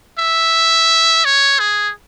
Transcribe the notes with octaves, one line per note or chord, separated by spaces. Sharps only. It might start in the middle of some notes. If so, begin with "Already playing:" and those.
E5
C#5
G#4